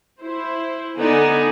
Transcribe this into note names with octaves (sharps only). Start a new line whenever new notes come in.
E4 C5
D3 B3 D#4 D5 G#5